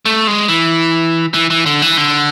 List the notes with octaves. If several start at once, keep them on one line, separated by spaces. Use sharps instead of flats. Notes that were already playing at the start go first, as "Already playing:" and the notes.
A3
G#3
E3
E3
E3
D3
E3
D3